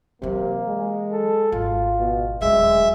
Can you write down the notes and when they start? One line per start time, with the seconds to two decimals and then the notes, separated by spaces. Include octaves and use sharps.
0.22 C3 E3 F#3 A#3
0.67 G#3
1.12 A4
1.52 G#1 F4
1.99 B2
2.41 D1 C#3 G#3 E5